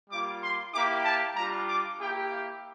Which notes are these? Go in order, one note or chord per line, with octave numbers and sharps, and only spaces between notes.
G3 A#3 F4 D6
C6
A#3 E4 G4 D6
A5
G3 D4 F4 A#5
D6
A#3 E4 G4 G5
F5